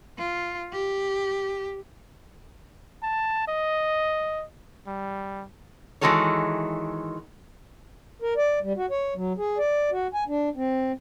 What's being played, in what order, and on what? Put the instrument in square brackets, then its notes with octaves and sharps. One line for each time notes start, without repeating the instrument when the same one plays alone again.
[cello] F4
G4
[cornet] A5
D#5
G3
[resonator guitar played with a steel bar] D#3 E3 G#3 F#4 A4 C#5
[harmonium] A#4
D5
G3
F#4
C#5
F#3
G#4
D5
F#4
G#5
D4
C4